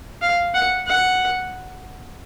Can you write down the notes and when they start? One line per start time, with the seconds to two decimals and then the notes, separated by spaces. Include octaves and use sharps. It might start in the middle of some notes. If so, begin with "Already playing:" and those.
0.22 F5
0.54 F#5
0.87 F#5